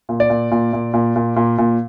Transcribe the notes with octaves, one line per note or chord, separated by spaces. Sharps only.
A#2
D5
A#2
A#2
A#2
A#2
A#2
A#2
A#2